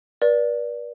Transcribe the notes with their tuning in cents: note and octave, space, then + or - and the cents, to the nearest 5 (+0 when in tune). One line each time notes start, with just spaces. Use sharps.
B4 -40 D5 +0